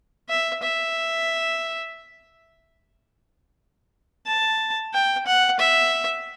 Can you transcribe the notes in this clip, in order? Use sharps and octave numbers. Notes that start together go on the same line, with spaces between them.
E5
E5
A5
G5
F#5
E5